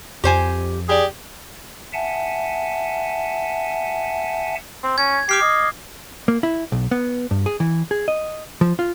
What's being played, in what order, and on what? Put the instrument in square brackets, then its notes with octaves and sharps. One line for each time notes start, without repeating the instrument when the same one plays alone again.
[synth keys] F2 [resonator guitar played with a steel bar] G4 C5 G#5
[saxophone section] G4 G#4 D5
[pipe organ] E5 F#5 G#5 A5
[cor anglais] C4
[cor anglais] C#4 [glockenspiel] G#6
[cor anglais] G4 [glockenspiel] D6 F6 C7
[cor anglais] D#5
[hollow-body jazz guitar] A#3
E4
B1
B3
G2
G#4
E3
G#4
D#5
F3
F4